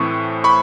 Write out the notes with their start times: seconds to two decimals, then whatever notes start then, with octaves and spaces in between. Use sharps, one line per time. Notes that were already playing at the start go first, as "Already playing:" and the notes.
Already playing: A2 E3 A3 C4 C#6
0.44 B5 C#6